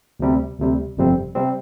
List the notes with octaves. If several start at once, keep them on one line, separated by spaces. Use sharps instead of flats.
D2 C3 G3
D2 C3 G3
G1 F2 C3 G3 C4
C3 G3 C4